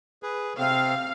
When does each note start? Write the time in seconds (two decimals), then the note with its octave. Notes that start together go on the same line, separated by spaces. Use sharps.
0.23 G#4 B4
0.58 C3 C4 F5